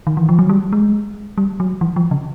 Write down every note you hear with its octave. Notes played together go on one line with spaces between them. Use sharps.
D#3
E3
F3
F#3
G3
G#3
G3
F#3
E3
F3
C#3